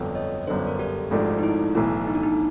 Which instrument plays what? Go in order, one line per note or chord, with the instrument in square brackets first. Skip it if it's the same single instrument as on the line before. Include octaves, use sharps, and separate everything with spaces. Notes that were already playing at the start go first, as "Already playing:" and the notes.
Already playing: [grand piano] G1 F2 D3 F#3
[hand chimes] C#5 D#5
[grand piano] G1 F#2 D3 [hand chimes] C5 D5
[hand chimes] A#4
G4 A4
[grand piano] G#1 G#2 F3 A3 D4
[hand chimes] D#4
E4
[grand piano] B1 A2 E3
[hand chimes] D#4
D4
D#4